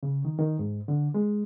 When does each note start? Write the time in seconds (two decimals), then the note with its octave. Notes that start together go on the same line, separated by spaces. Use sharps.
0.03 C#3
0.25 D#3
0.39 D#3
0.59 G#2
0.88 D3
1.14 G#3